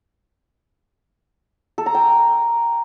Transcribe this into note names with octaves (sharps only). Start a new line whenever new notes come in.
A4
A#5
G5